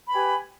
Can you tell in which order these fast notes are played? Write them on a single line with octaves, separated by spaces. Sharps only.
B5 B4 G#5 G4